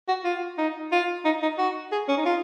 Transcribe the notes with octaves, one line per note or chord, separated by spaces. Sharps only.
F#4
F4
D#4
F4
D#4
D#4
F#4
G#4
C#4
D#4
F4